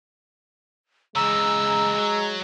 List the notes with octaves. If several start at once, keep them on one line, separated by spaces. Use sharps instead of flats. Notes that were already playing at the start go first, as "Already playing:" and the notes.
C#3 E3 G#3 A#5 E6
F#3